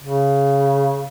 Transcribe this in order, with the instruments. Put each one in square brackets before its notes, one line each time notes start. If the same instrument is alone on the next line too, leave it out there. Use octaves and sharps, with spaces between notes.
[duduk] C#3